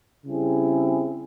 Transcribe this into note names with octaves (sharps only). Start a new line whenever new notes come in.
C#3 G3 C4 E4 G#4